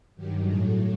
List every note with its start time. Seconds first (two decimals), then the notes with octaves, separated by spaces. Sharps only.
0.16 G2 D#3 F#3 G4
0.46 A2 F#3 A3 G#4